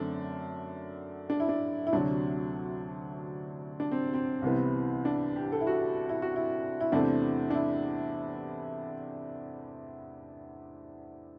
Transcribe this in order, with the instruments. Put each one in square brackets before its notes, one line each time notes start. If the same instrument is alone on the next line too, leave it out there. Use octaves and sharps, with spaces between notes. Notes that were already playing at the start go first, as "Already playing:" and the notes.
Already playing: [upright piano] F#2 D3 A3 C4 D4
D4
E4
D4
E4
D2 C3 F#3 D4
D4
C4
C4
C2 C3 E3 B3
D4
G4
A4
E4
F#4
E4
F#4
E4
E4
E2 C3 E3 A3 C4 D4
D4
E4